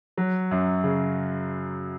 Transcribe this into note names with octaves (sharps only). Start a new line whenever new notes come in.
F#3
F#2
C#3